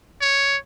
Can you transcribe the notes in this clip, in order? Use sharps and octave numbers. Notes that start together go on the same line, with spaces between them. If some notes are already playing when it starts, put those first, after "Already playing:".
C#5